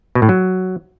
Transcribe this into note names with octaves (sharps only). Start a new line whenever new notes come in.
B2
A2
F#3